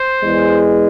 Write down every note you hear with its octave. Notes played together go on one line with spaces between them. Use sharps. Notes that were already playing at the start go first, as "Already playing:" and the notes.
Already playing: C5
E2 E3 G#3